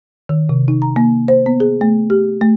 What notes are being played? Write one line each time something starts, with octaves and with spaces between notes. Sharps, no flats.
D#3
C3
D#4
A#5
A#3
C5
B3
G#4
A3
G4
A3